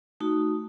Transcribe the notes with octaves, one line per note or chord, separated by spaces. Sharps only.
A3 D#4 F#4